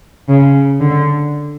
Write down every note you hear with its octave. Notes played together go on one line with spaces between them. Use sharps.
C#3
D3